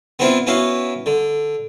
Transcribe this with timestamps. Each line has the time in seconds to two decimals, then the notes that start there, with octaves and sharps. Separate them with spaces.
0.19 B3 C4 D4 E4 F4
0.47 B3 C#4 E4 F#4 F5
1.06 D3